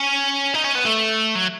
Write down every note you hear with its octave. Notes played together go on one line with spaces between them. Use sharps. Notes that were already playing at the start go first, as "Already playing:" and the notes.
Already playing: C#4
D#4
C#4
B3
A3
F#3